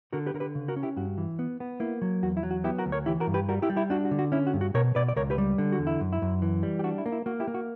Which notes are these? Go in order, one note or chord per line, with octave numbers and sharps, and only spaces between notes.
D3 F#4 A#4
G4 B4
D3 A#4
G4 B4
C#3
F#4 A#4
C#4
E4 G4
G2 F#4
E3
B3
B3
A#3 E4
F#3
E2 F#4
E4
F#3
F#4
B3 E4 G4
F#4 A#4
D2
A#4 C#5
E3 E4 G4
F#4 A#4
G2
G4 B4
G3 F#4 A#4
E4 G4
G3
E4 G4
D4 F#4
F#4
D3
F#4
C#4 E4
F#4
G2
F#4
B2 A#4 C#5
B2 B4 D5
D5
C#2 A#4 C#5
G4 B4
G3
D3
F#4
E2
E4
F#2
E4
F#2
E3
G3
G4
D4 F#4
E4
A#3
E4
A#3 F#4
E4 G4
A#3
F#4